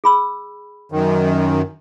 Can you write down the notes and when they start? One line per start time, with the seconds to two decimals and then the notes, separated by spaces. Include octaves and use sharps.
0.04 G#4 B5 E6
0.92 F#2 D#3